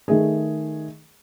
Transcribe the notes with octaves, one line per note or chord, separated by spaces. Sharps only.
D#3 A3 G#4